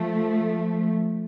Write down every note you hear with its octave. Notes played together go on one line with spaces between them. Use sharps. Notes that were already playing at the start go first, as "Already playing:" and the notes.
Already playing: F3 A3